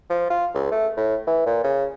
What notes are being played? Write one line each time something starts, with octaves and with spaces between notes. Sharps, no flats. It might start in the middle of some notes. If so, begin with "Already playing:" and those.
F3
F4
C#2
A3
A2
E3
A#2
C#3